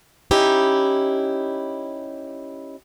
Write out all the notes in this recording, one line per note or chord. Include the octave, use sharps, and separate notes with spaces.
C#4 D#4 E4 G4